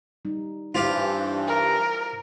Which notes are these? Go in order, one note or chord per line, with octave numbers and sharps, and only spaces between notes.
G3 D#4
G2 E3 E4 F4 G4 C5 F5
A#4